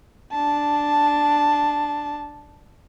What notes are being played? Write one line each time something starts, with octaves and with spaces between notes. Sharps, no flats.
D4 A5